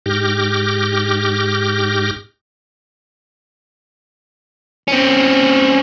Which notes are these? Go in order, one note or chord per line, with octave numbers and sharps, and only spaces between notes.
G#2 G4 D6 F6 G6 A#6
C4 C#4